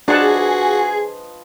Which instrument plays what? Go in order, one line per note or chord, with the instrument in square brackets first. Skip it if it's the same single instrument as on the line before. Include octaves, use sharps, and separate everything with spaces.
[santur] F3 B4 D#5 [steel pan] D4 F#5 A5 [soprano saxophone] F#4 [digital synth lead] G#4